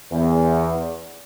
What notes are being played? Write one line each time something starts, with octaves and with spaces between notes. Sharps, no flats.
E2